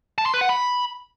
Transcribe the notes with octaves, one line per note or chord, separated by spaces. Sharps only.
A5
C6
B4
F#5
B5